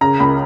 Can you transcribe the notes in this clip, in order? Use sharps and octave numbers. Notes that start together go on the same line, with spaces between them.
C#3 A#5
C#2 B5